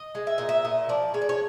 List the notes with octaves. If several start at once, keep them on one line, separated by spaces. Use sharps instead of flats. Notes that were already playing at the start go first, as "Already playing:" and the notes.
Already playing: D#5
G#3
E5
A#2 D#5
E5
A#2 D#5
F3 D5
G#3 C#5
D5
C#5